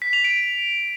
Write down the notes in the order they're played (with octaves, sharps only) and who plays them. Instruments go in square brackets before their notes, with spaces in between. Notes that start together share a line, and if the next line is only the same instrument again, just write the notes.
[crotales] B6
F7
D7